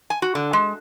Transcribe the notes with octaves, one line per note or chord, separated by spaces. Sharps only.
G#5
F#4
D3
G#3